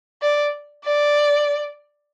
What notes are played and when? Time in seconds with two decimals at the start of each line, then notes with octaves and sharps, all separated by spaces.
0.22 D5
0.84 D5